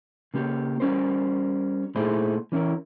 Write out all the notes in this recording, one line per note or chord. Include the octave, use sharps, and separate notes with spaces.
C#3 A#3 G4
G3 C#4 A#4 C5
A#2 A3 D#4 E4 G#4 C5
E3 C#4 E4 A#4